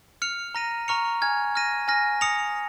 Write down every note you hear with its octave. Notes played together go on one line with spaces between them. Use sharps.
F6 C#7 F7
A#5 F6 A#6 D#7
A#5 C#6 F6 C#7 F7
G#5 F6 G#6
F6 A#6 D#7
G#5 F6 A#6
D#6 A#6 C#7 F7